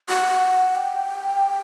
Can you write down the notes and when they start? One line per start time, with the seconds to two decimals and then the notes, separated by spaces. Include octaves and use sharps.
0.09 F#5
0.75 G5